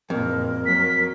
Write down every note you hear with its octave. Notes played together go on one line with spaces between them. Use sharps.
F#1 F2 A#2 A#4
F#3 B6